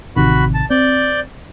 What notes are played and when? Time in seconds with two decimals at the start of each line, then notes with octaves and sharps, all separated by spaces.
0.16 A1 C3 D#3 F#4 B5
0.54 A5
0.70 C4 D5 G6